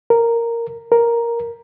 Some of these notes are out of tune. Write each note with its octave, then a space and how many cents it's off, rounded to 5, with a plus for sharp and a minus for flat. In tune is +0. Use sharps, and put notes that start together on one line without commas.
A#4 -5
A#4 +5